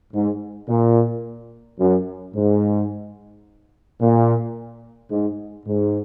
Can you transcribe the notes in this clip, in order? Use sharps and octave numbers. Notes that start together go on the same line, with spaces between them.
G#2
A#2
F#2
G#2
A#2
G#2
G#2